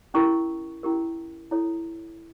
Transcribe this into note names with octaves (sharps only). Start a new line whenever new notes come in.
C#4 E4 G4 A#4 C#6
C#4 E4 G4 A#4
E4 A4 C#5